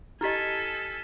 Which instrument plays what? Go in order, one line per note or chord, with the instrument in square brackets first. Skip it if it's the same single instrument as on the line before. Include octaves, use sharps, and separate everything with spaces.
[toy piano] E4 G4 D#5 [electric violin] A4 G#5 [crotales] F6 A6 B6